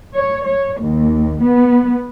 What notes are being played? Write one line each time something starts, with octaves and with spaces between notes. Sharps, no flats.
C#5
C#5
D#2
B3